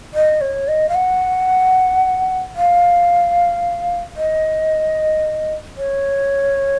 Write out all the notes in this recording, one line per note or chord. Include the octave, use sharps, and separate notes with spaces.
D#5
C#5
D#5
F5
F#5
F5
D#5
C#5